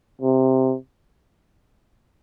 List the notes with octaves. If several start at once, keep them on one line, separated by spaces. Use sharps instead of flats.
C3